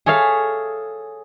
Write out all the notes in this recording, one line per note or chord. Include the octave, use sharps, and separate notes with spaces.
G#4 A4 C#5 E5 F5